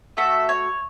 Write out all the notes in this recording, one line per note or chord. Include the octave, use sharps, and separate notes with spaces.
A3 F#4 A4 E5
C#5